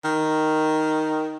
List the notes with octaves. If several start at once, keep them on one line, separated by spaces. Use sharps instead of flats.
D#3